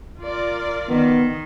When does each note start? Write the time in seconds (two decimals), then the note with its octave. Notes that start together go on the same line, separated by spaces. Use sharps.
0.20 F4 A#4 D5
0.89 D#3 B3